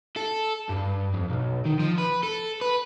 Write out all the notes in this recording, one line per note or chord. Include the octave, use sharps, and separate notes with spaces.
A4
G2
F2
B1
D#3
F3
B4
A4
B4